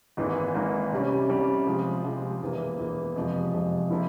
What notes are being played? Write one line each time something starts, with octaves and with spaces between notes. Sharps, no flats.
G#1 G#2 E3 A#3
G#1 G#2 E3 A#3
C2 C3 G3 C#4
C2 C3 G3 C#4
C3 F3 G#3
C3 F3 G#3
E1 E2 E3 A#3
E1 E2 E3 A#3
F2 C3 F3 G#3
F2 C3 F3 G#3
C3 F3 A#3 E4